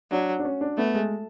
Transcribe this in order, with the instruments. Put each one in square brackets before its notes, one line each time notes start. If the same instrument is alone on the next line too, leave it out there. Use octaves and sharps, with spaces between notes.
[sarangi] F#3 [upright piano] D4
[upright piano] D4
C#4
D4
[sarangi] A3 [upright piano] B3
[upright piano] G#3